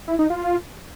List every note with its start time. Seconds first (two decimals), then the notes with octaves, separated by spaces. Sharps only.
0.08 E4
0.19 D#4
0.30 F4